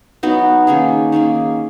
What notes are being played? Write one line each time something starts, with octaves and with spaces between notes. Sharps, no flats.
F#3 B3 D#4 F#4
D#3 A#3 C#4 G#4
D#3 A#3 C#4 G#4